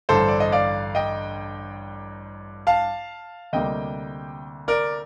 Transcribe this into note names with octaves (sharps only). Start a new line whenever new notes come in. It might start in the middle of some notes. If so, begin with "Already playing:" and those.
A1 G2 D3 A4 C5
D5
D#5
D5 F5
D#5 G5
F5 A5
D2 C3 G3 A#3 D#5 G5
A#4 D5